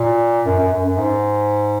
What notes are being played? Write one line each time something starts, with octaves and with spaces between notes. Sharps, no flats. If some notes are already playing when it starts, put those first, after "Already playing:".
Already playing: A#2
F#2
F#2
F#2
F#2
G#2